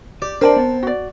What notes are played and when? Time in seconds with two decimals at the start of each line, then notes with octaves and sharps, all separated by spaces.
0.22 G4 D5
0.41 C4 D4 A#4 C5 D5 A5
0.56 B3
0.83 F#4 D5